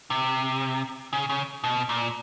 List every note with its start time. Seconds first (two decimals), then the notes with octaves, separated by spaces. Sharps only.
0.10 C3
1.13 C#3
1.29 C#3
1.64 B2
1.89 A#2